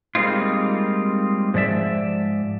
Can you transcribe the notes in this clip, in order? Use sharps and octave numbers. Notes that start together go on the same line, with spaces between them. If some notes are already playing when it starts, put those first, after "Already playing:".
G3 G#3 A#3 C4 D#4 F4
G#2 F3 D5 E5